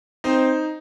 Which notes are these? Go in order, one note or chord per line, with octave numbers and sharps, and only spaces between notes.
C4 D#4 C5